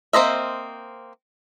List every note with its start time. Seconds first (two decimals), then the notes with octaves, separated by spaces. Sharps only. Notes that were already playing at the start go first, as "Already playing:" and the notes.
0.13 A#3 C4 C5 D#5 E5